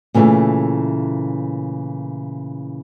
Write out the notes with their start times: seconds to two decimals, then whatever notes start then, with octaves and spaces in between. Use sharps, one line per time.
0.14 A#2 C#3 E3 G3 A3